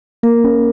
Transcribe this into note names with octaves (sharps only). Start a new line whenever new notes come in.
A#3 A#4
C#4